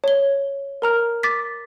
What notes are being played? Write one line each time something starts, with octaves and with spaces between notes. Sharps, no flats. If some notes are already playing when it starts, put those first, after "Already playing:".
C#5 G7
A#4 A#5 F6
D6 A6 B6